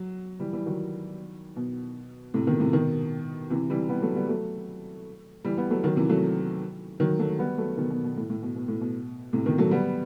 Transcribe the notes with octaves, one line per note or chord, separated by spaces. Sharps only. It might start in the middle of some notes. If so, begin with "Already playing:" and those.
Already playing: F#3
E3 G3
E3 G3
D#3 F#3
B2
A2 C3
B2 D#3
A2 C3
B2 D#3
C3 E3
E3 G3
G3 B3
F#3 A3
G3 B3
F#3 A3
E3 G3
G3 B3
F#3 A3
D#3 F#3
C3 E3
F#3 A3
D#3 F#3
F#3 A3
G3 B3
F#3 A3
B2 D#3
B2
B2
A2
A2
B2
B2
A2
B2
A2 C3
B2 D#3
F#3 A3
G3 B3